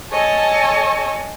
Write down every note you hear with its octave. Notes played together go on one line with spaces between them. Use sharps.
A4 C#5 D#5 G#5 A5